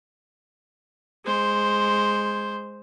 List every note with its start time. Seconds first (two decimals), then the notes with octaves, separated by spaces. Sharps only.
1.25 G#3 C5